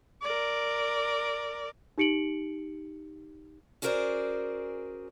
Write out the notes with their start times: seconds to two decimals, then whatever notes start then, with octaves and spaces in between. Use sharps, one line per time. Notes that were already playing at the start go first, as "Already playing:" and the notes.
0.22 A#4 D5
1.98 D#4 G4 C#7 D7 F#7
3.82 C#4 F#4 G#4 A#4 C5 D5